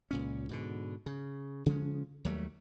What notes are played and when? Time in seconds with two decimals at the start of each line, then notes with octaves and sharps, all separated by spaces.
0.11 C#2 A#2 C#4
0.49 G#2 B2 D3
1.06 C#3
1.66 C#3 F3 G#3 C#4
2.25 D#2 F#3 G3 A3